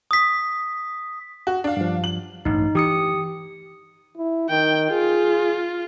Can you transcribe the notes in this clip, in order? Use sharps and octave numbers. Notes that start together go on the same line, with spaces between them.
D#6 B6
F#4
D4 F5
G2 F3
F#7
A1 G2 D#4
E3 G4 D#6 C#7
E4
D#3 G5
F4 G#4